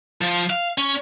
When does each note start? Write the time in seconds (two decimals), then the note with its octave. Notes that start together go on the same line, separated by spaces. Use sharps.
0.21 F3
0.50 F5
0.78 C#4